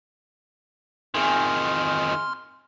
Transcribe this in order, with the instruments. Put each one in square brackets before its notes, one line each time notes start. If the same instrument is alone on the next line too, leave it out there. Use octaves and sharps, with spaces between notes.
[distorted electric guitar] F2 D#3 [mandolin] G#4 E5 G#5 [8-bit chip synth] C6 F6